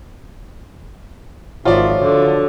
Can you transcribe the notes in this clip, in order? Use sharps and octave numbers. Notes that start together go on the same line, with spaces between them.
G#1 F3 F#3 F4 D5 E5 D#6
D3